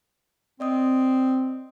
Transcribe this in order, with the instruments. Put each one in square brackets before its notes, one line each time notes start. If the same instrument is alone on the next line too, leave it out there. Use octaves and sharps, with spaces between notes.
[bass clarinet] C4 [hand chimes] D5 D#5 D#6